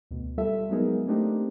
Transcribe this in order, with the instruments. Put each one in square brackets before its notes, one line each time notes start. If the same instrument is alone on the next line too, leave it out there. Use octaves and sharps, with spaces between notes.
[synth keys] D2 B2
G3 F4 A4 E5
F#3 G#3 B3 D#4 G#4 A#4
A3 A#3 C4 D4 D#4 G4